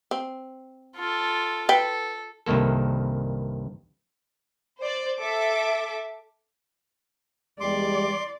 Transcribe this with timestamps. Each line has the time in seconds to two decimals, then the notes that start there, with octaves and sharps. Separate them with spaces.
0.11 C4
0.97 F4 A4
1.69 A4 B4 G5
2.46 C2 G2 D#3 A#3 A4
4.79 C5 D5
5.18 A4 E5 D6
7.60 E2 G3 G#3 D5 C6 D6